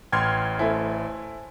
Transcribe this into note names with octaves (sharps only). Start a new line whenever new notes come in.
A1 G5 C6 F6 G#6
A3 E4 C5 G#5 A5